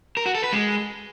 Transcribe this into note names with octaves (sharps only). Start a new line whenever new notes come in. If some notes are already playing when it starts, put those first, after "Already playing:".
A#4
F#4
A4
B4
G#3